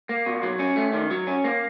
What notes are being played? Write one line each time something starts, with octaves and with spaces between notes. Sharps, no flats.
A#3
B2
F#3
C#4
A3
D#3
F#3
C#4
A#3